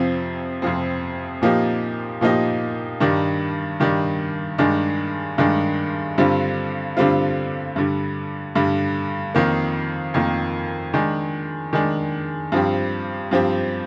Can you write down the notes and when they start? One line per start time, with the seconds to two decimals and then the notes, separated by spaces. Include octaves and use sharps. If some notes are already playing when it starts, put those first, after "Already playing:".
Already playing: F2 C3 F3 C4
0.62 F2 C3 F3 C4
1.42 A#2 F3 A#3 D#4 G4
2.21 A#2 F3 A#3 D#4 G4
3.00 G2 D#3 G3 D4
3.80 G2 D#3 G3 D4
4.58 G2 D#3 G#3 D4
5.38 G2 D#3 G#3 D4
6.18 G2 D3 G3 C4 F4
6.97 G2 D3 G3 C4 F4
7.76 G2 D3 G3
8.55 G2 D3 G3
9.35 F2 D#3 A#3
10.14 F2 D#3 A#3
10.94 D#3 G#3 D4
11.73 D#3 G#3 D4
12.52 G2 F3 C4 G4
13.31 G2 F3 C4 G4